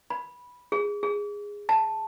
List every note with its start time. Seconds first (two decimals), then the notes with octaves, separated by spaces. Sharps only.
0.10 B5
0.72 G#4
1.03 G#4
1.69 A5